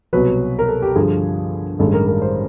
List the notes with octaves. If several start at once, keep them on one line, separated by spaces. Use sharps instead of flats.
C2 B2 F#3 B4
A#4
A4
G4
G2 D3 F3 G#4
A1 G2 D#3 G#3 A4
A#4
A#4
C5